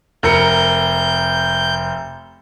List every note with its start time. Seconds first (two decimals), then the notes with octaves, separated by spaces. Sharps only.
0.23 F1 A#4 G6 C#7